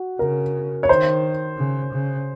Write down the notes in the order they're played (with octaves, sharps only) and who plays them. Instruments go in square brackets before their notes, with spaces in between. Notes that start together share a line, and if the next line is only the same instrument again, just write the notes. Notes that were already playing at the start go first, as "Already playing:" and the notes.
Already playing: [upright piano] F#4
[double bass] C#3 [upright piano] A#4
[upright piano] C#5
[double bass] D#3 [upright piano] C5
[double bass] C#3
C#3